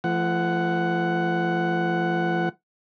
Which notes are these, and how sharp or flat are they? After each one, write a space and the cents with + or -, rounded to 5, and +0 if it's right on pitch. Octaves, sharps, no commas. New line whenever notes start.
F3 -35 A3 +0 F#5 +5